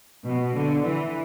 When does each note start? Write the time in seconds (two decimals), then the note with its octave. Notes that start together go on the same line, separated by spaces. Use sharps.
0.24 B2
0.54 D3
0.84 E3